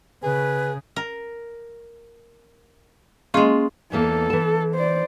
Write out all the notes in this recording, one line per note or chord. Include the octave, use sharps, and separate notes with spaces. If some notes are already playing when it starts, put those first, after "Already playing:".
C#3 G#4 B4
A#4
G#3 A#3 C#4 F4 G#4
E2 E3 A#3 A4
E3 A5
C5 D5